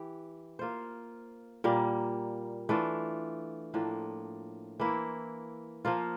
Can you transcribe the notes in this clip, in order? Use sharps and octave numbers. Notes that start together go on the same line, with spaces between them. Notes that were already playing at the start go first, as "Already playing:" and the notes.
Already playing: E3 G4
A#3 F4 C5
A#2 G3 A#3
E3 A3 D4 F4
A2 F3 A#3 D4
E3 A#3 E4
F3 A#3 F4